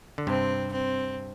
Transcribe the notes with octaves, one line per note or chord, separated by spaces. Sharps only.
D3
G2 C3 C4
C4